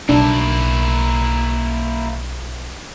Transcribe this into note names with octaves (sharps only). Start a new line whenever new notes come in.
B1 A#3 D4 E4